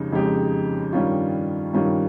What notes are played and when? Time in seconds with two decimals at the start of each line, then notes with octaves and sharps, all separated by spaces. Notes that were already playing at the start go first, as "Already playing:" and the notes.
Already playing: F2 C#3 G#3 D#4 G4
0.12 F2 C#3 G#3 D#4 G4
0.93 G2 D#3 G3 C#4 F4
1.73 G2 D#3 G3 C#4 F4